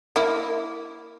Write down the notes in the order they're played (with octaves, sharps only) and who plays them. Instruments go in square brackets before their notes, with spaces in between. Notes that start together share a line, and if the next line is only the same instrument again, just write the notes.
[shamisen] A#3 E4